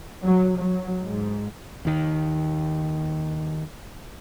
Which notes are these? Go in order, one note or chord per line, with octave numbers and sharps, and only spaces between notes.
F#3
F#3
G#2
D#2 D#3